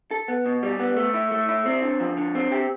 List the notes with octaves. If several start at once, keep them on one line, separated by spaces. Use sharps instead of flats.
A4
B3
B2
G3
B3
A3
E4
A3
E4
C4
D3
F3
D3
C4
G4